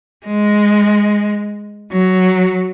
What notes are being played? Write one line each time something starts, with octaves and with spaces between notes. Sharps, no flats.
G#3
F#3